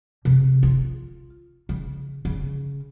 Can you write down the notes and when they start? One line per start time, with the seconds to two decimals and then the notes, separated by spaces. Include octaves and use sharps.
0.25 C3
0.63 F4
1.69 C#3
2.25 C#3